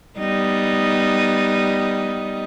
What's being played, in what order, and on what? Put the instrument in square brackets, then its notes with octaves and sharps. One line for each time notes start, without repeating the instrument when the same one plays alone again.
[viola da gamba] G3 B3 D#4